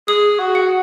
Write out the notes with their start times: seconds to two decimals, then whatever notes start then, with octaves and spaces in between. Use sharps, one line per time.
0.08 G#4 D#6
0.39 F#4
0.55 F#5